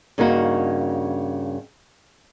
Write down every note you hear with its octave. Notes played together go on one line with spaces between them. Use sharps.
G2 C#3 A#3 D#4 F#4